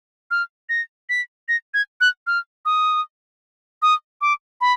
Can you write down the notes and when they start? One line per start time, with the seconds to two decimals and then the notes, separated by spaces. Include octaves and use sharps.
0.31 F6
0.69 A#6
1.09 B6
1.48 A#6
1.74 G#6
2.01 F#6
2.27 F6
2.65 D#6
3.82 D#6
4.21 D6
4.61 B5